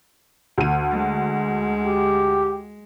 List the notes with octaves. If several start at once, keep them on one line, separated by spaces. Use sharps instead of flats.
D2 D#7
G#3
G4